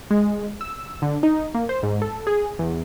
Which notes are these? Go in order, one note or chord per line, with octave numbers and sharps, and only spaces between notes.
G#3
E6
D3
D#4
A#3
C5
G#2
A4
G#4
E2